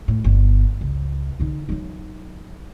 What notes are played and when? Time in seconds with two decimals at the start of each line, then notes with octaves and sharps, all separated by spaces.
0.08 A2
0.24 G1
0.81 C#2
1.40 D3 D#4
1.69 F#3 D#4